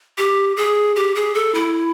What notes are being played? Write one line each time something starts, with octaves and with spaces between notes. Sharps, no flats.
G4
G#4
G4
G#4
A4
E4